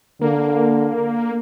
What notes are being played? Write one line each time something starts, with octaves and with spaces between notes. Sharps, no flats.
D3 A#3